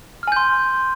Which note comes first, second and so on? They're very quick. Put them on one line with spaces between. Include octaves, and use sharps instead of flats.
F6 G#5 G6 C6